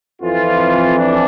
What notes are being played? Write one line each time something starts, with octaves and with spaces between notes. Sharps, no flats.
F2 E3 F4
D4